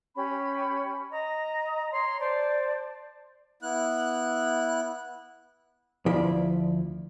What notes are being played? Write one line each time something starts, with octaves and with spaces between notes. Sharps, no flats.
C#4 G4 B5
D#5 A#5
C#5 A#5 C6
C5 D5 A5
B3 E4 F#6
D2 F3 E4 D5